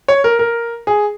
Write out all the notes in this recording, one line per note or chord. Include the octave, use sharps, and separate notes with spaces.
C#5
A#4
A#4
G#4